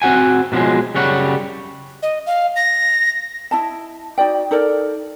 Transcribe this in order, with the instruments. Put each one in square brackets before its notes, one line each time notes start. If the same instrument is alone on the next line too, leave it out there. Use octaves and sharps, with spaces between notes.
[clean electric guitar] C4 F#4 F#5 G#5
B2 D3 F3 F#3 G#3
F#2 C#3 G3 C#5 F#5
[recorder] D#5
F5
A#6
[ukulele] E4 D#5 A5
D#4 F#4 D5 G5
D#4 A4 A#4 D5